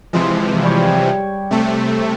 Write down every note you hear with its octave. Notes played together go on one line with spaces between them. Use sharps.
C3 E3 F3 G#3
G3 G4 C#5
C3 A3